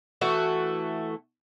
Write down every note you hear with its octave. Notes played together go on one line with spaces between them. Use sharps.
E3 A3 F#4